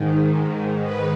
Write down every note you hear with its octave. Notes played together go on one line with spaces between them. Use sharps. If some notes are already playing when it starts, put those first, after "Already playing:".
Already playing: G#2 D#3
B4